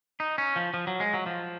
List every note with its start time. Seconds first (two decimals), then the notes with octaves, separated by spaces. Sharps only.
0.20 D#4
0.38 C#4
0.56 F3
0.74 F3
0.87 F#3
1.00 G#3
1.14 F#3
1.26 F3